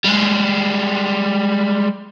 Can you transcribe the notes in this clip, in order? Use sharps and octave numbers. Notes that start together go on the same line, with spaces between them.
G3 G#3